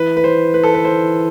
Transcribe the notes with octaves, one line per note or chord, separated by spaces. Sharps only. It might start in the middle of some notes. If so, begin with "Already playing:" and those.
Already playing: E3 B4
B4
C5
B4
A4
B4
C5